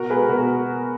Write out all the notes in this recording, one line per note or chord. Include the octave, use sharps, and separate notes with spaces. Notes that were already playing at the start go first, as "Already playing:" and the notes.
Already playing: B2 F#4 A#4
G#3 G#4 B4
B2 F#4 A#4